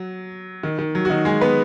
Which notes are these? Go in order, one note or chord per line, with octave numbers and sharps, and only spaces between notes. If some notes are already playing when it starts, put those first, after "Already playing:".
Already playing: F#3
D#3
D#3
F#3
F#4
D#3 D#4
G#3 G#4
B3 B4